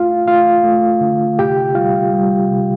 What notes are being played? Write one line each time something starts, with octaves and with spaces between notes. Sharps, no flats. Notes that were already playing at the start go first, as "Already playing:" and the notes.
Already playing: A3 F4 F5
A3 F4 F5
A3
D3
C3 G4 G5
G3 F4 F5
G3
C3